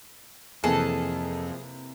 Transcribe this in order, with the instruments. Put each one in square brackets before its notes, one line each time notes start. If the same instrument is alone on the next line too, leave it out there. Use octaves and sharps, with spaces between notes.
[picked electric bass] F2 [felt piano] C3 E3 A#3 [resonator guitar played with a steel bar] G#4 [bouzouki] A4